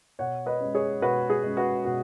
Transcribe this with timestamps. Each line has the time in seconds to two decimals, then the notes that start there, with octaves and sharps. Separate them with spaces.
0.19 B2 C#5 F#5
0.46 B4 D#5
0.60 G#3 C#4
0.75 G#4 C#5
1.02 B2 F#4 B4
1.30 G#4
1.43 G#3 C#4
1.57 F#4 B4
1.85 B2 F#4